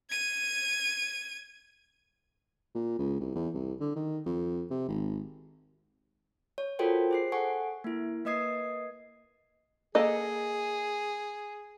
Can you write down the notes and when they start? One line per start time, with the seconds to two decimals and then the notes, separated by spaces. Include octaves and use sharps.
0.10 G#6 D#7
2.75 A#2
2.99 C#2
3.20 C2
3.36 E2
3.54 C2
3.80 D3
3.96 D#3
4.26 F2
4.71 C3
4.88 G#1
6.58 C#5
6.79 F4 F#4 A4 A#4 C5 G5
7.11 G#4 C5 C7
7.32 A4 F#5 G#5 C#6
7.84 A#3 E4
8.25 A#3 B4 D#5 D#6 G#6 C7
9.95 A#3 G#4 A4 D#5